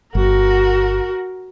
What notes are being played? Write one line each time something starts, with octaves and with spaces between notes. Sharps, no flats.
G1 F#4 A#4